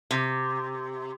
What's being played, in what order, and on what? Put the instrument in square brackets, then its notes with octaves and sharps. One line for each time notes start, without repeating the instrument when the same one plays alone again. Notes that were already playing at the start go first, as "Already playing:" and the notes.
[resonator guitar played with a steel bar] C3